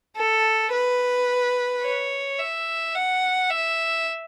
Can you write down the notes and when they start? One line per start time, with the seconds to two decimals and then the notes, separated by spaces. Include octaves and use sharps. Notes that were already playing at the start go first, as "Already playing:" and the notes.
0.16 A4
0.72 B4
1.83 C#5
2.39 E5
2.95 F#5
3.50 E5